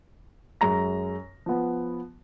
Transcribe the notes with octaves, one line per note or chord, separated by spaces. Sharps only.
F#2 G#3 A#5 A#6
F3 B3